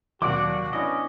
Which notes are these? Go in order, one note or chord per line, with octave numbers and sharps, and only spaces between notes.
D#2 C3 F#3 F#4 D5 F#5 D6
B3 C#4 D4 E4 D#5